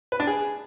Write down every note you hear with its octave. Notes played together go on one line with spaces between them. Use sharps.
B4
D4
G#4